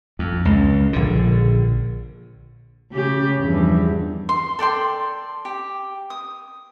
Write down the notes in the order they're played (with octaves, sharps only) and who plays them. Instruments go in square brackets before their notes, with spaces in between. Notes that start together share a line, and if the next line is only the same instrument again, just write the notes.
[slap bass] F2
C#2
A#1 D3
[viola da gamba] C#3 G4
E2 G2 F3
[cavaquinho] C6
A4 D5 G5 C6
G4
D#6